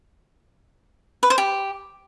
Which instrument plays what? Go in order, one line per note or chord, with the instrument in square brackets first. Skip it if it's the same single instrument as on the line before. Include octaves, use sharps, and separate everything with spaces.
[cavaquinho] B4
C5
G4